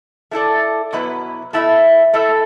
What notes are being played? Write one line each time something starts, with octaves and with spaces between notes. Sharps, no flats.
A3 E4 A4 D5
B2 F#3 B3 E4 B4
B2 A3 E4 A4 E5
A3 E4 A4 E5